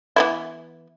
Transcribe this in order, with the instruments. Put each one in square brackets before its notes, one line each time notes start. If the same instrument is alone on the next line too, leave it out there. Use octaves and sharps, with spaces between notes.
[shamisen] E3 B3 E4